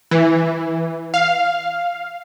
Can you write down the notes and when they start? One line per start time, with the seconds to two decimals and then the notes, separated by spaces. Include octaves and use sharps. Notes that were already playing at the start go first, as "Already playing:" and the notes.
0.11 E3
1.14 F5